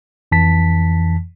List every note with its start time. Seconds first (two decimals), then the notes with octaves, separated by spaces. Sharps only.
0.32 F2 E3 A5 B6